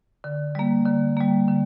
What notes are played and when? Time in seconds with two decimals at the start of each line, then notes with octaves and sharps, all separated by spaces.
0.24 D3
0.55 G3 A#3
0.86 D3
1.17 G3 A#3
1.48 D3